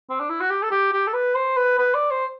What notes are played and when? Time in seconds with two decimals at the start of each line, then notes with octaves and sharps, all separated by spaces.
0.09 C4
0.20 D4
0.29 E4
0.40 F#4
0.50 G4
0.63 A4
0.71 G4
0.93 G4
1.07 A4
1.13 B4
1.35 C5
1.57 B4
1.78 B4
1.94 D5
2.11 C5